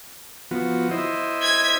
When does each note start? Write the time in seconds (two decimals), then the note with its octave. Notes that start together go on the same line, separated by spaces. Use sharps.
0.51 F3 B3 F#4
0.91 E4 C5 D#5
1.41 G#6 B6